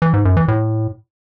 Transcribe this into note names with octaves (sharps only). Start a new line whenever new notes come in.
E3
G#2
F#2
E3
A2